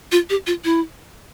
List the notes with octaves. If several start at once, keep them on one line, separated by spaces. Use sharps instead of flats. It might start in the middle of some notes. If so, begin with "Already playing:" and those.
F4
G4
F4
E4